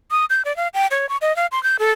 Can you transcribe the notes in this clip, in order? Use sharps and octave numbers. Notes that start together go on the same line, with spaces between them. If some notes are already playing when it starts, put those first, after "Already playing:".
D#6
G6
D5
F5
G5
C#5
C#6
D#5
F5
C6
G6
A4